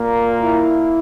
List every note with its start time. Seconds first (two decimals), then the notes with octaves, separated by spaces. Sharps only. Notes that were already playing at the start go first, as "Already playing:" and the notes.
Already playing: A#2 A#3
0.41 E4